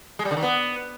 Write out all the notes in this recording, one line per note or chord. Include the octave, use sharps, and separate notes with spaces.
G#3
G3
D3
D#3
B3